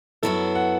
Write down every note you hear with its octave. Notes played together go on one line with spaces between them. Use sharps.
F#2 F#3 B3 E4 A4
F#5